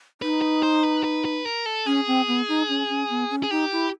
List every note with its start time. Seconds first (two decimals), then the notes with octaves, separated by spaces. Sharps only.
0.21 D#4 B4
0.42 B4
0.63 C5
0.83 B4
1.04 B4
1.25 B4
1.45 A#4
1.66 A4
1.86 C#4 G#4
2.07 C4
2.27 B3
2.48 D#4
2.69 C#4
2.89 C#4
3.10 B3
3.31 C#4
3.43 G#4
3.51 D#4 G4
3.72 E4